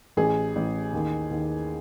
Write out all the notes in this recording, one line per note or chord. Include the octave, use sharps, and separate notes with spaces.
A1 G#4
A1
D#2
D#2